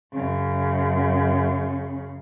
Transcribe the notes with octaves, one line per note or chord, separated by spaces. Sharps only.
F#2 C#3